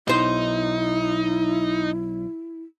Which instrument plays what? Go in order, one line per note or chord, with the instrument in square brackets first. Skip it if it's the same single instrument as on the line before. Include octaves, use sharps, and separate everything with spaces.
[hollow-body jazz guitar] B1 C5 [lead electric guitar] D#4 [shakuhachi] E4